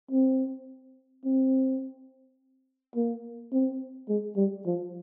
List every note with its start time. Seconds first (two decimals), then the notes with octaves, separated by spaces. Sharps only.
0.11 C4
1.25 C4
2.96 A#3
3.53 C4
4.09 G#3
4.37 G3
4.66 F3